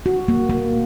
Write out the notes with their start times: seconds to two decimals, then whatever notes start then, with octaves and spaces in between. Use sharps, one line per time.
0.06 F#4
0.28 A#3
0.50 A#3